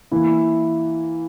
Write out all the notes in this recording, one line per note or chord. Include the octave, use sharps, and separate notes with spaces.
E3 A#3 E4